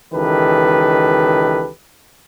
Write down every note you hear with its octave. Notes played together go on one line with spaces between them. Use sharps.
C#2 D#3 E3 G4 A4 B4